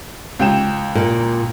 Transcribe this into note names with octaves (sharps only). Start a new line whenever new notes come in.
C#2 G5 E7
A#2